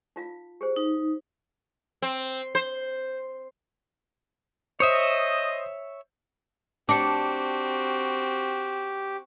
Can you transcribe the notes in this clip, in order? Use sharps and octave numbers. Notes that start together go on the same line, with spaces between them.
D#4 F4 F5
G4 G#4 C5
D#4
C4
C5
C5 C#5 D#5 E5 D#6
C4 D4 F#4 G4 D6 C#7